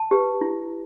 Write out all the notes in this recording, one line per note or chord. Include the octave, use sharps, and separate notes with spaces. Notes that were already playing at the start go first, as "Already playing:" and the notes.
Already playing: A5
G4 B4
E4